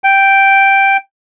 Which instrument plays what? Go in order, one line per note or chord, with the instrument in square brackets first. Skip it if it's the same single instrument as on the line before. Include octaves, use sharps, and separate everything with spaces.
[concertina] G5